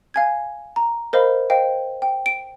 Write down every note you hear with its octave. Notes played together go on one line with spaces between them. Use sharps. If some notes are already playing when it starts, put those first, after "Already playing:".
F5 G#5 G#6
A#5
A#4 C5 D#5 F5 B5
C5 D#5 F5 G5
G5
D7